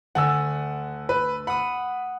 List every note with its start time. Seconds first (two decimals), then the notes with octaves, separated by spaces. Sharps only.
0.15 D2 D3 F#5 G#5 E6
1.09 B4
1.47 F#5 B5 D#6